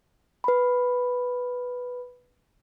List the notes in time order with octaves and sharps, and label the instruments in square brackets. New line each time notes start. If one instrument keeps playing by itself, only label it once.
[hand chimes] B4 B5